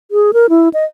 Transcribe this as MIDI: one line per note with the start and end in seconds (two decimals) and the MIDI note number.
0.11 0.31 68
0.33 0.47 70
0.50 0.69 64
0.74 0.85 75